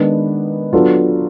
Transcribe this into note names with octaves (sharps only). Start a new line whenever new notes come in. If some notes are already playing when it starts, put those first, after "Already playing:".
Already playing: D#3 G#3 B3 D4
F#3 B3 D4 F4 A4